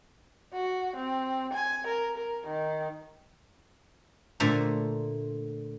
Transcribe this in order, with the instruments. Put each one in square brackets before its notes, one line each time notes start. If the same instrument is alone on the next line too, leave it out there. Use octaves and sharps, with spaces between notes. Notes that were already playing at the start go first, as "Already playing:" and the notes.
[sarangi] F#4
C4
G#5
A#4
A#4
D#3
[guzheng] A#2 D3 A3 C5 E5 A#5